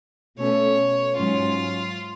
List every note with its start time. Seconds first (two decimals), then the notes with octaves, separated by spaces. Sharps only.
0.38 B2 A3 C#4 C#5
1.16 G#2 F#3 C#4 F4